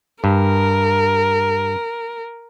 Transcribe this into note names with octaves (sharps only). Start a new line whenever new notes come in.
G2 A#4